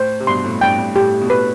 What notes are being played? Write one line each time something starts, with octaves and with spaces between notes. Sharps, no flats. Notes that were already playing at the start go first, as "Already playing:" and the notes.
Already playing: A2 C5
C3
G2 B2 C6
A2
G2 G5
G2
A2 G4
B2
A2 B4